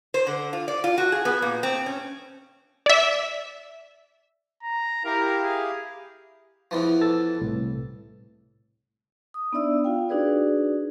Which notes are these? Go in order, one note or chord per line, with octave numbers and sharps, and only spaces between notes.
C5
D3
F4
D5
F4
F#4
G#4
B3
A#2
C4
C#4
D5 E5
A#5
E4 G4 A#4 F5
G#4
E2 E3 F3
A4 E6 A6
C2 A2
D#6
B3 D4 D#4 D5 E5 E6
F4 F5 G5
D4 D#4 F#4 G#4 B4 D5